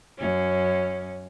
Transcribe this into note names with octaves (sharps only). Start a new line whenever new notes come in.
F#2 C#4